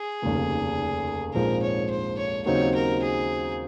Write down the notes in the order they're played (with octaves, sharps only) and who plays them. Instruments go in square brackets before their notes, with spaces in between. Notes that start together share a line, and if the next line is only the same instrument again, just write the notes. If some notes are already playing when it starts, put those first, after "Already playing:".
Already playing: [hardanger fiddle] G#4
[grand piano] F1 D#2 C#3
[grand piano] A#1 G#2 F3 G#3 C4 [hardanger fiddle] A#4
[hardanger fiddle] C#5
C5
C#5
[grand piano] D#2 C#3 F#3 C4 D#4 [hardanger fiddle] C#5
[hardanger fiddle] A#4
G#4